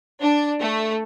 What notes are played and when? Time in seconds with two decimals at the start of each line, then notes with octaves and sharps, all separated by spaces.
0.21 D4
0.61 A3